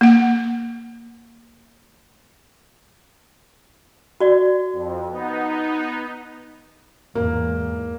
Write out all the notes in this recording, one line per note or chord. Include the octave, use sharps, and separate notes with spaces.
A#3 F#5
F#4 D5
F2
B3 D#4
E2 G#2 A#3